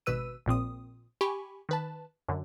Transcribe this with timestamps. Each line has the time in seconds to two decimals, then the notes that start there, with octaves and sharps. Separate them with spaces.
0.06 G#1 B2 B4 E6 D#7
0.46 A#1 A#2 C4 D#6
1.21 G4 G#5 B5 C#6
1.69 D#3 B4 A5
2.28 F#2 D3